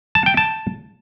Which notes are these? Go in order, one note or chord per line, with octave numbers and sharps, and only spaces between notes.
A5
G5
A5